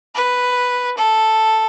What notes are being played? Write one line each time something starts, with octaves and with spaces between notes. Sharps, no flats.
B4
A4